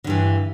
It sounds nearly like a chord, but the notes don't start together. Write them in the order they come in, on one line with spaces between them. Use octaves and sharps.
D3 G2 E3